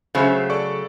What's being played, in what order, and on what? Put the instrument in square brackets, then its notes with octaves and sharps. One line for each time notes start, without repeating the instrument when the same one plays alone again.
[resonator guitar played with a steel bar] C#3 F#3 A3 [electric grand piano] C5 E5
[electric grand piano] A4 D5 C#6